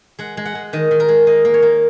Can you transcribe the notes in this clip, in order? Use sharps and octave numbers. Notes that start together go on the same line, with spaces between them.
G#3 F#5
G#3
F#5
G#3
D#3 D#5
D#3
A#4
G#3
A#3 D#5
A#3
C#5
A#3